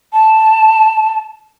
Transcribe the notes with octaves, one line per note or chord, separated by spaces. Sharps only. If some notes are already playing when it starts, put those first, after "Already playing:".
A5